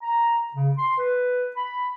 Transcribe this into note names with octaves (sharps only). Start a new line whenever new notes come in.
A#5
C#3
C6
B4
B5